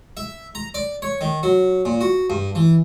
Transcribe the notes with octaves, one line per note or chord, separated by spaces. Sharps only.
E5
A#5
D5
C#5
D#3
F#3
A#2
F#4
G2
E3